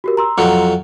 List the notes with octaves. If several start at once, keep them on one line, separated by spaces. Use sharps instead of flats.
F#4 G4 A#4
A#5 C6 E6
F2 F#3